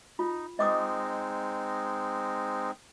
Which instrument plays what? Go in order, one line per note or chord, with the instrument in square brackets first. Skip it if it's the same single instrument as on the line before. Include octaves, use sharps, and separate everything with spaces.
[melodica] D#4 [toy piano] F4
[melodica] G#3 C4 D#4 [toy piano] D#5 D6 D#6